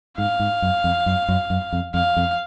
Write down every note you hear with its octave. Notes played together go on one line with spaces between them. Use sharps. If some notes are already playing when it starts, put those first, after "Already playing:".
G#2 F5
G#2
F#2
F2
F#2
F#2
F#2
F2
F2 F5
F2